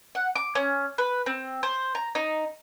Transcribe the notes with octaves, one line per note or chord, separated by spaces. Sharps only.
F#5
D6
C#4
B4
C4
C5
A#5
D#4